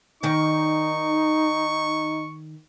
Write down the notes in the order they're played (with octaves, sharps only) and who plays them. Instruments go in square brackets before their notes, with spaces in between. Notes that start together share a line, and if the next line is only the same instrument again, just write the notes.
[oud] D#3 D5 [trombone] D#4 [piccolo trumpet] C#6